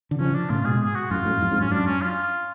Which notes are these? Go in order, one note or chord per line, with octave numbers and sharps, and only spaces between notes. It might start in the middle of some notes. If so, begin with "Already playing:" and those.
D3
C#3 F3 C#4
D4
A2 C#3 F4
G#2 B2 G#4
G#4
F#4
F#2 A2 F4
F#2 A2
F2 G#2
G#2
F#2
C#4
G#2
F#2 D4
C#4
F4